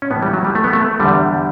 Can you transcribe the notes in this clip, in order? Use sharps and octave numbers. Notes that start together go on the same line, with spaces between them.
C#4
A2 E3 B3
G3
F#3
G3
A3
B3
A3
E2 D3 G3